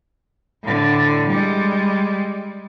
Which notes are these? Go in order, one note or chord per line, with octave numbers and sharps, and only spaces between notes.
A2 D3
G3 G#3